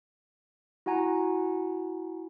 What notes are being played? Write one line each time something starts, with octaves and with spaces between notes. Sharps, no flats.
E4 F#4 F#5 G#5 A#5